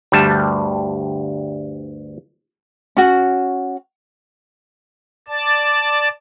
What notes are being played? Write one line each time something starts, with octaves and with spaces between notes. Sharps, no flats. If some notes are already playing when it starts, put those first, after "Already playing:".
D2 G2 G3 A5
C#4 F#4
D5 A5